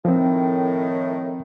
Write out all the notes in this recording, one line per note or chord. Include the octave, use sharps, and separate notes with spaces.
A2 D#3 F3 C4